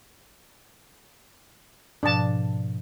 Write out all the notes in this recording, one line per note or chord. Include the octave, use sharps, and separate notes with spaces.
G#2 B2 F3 D4 A5